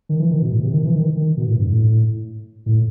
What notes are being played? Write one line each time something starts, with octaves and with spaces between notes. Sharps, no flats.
D#3
E3
D#3
B2
A2
C3
D#3
E3
D#3
D#3
B2
A2
G2
A2
A2